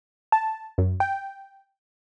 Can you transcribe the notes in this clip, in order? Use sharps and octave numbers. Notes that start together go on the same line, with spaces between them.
A5
F#2
G5